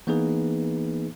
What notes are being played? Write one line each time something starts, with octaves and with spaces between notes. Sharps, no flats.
E3 A#3 B3 D#4 G#4 B4